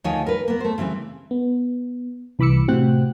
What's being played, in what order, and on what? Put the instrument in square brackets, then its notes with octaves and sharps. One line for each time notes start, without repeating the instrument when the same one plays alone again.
[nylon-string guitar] D2 D#3 F3 D#4 C#5 G#5
A#4 B4
A#3 B3
A3 C5
C#3 E3 G3 C4
[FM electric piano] B3
C2 E3 B5 D6 E6 C#7
A2 C3 C4 F#4 G5 F#6